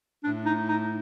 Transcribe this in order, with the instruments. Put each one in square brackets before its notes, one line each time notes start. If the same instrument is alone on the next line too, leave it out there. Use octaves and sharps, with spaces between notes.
[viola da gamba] A2 [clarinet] D4
[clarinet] D#4
D#4